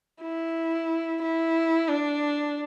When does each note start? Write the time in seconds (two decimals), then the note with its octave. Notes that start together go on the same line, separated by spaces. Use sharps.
0.22 E4
1.22 E4
1.89 D4